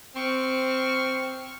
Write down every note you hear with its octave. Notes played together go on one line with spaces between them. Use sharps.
C4 C#6 F6